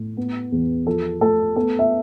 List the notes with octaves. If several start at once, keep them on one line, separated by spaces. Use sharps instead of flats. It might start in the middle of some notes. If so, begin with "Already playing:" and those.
Already playing: A2
B3
E2
F3 A4
A3 A4
B3 A4
E5